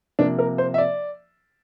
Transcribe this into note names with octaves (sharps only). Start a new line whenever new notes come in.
C3 F3 A#3 D4
A#4
C5
E5
D5